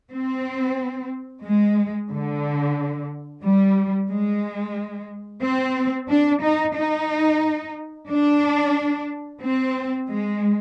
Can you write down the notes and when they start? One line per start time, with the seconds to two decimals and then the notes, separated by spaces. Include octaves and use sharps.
0.11 C4
1.43 G#3
2.10 D3
3.43 G3
4.10 G#3
5.42 C4
6.09 D4
6.42 D#4
6.75 D#4
8.09 D4
9.41 C4
10.08 G#3